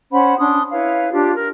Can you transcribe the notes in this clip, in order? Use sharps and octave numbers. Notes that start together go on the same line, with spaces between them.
C#4 C5 F#5 B5
C#4 D4 C6 D#6
E4 B4 C#5 F5
D4 F4 G4
A#4